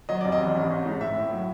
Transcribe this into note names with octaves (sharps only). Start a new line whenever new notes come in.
F#3 D#5
F1 D5
D#5
E2
A1
A1
G#2
A2 E5
A2
F#3